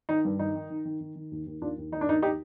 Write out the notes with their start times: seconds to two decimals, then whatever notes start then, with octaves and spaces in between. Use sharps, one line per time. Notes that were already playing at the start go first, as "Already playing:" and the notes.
0.09 D#3 D#4
0.25 G2
0.39 D#3 D#4
0.55 D#3
0.70 D#3
0.85 D#3
1.01 D#3
1.16 D#3
1.31 D#2
1.46 D#2
1.61 D#2 D4 F4
1.77 D#2
1.92 D#3 D#4
2.01 D4
2.07 D#2 D#4
2.22 D#4 G4